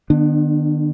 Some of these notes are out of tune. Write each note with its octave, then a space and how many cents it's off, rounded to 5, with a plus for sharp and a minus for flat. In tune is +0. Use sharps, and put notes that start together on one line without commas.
D#3 -45 B3 -15 D4 +20